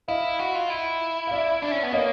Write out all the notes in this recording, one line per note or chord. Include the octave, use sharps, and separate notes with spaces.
E4 D#5 F5
F#4
F4
E4
F5
D5 E5
D4
C#4
B3
A#3 C#5 D#5